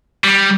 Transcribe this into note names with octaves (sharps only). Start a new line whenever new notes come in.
G3